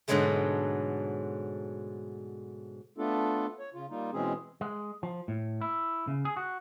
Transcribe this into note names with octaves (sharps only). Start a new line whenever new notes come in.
G#2 B2 D3 F#3 G#3 A3
A3 B3 D4 F4 A4
C#5
C#3 F4
G3 A#3 D#4 F4
B2 E3 G#3 C4 C#4 G#4
G#3
F3
A2
E4
C#3
G#4
F#4